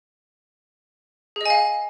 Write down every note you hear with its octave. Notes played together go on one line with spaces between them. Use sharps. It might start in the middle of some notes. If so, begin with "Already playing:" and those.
G#4 D#5 F5 G#5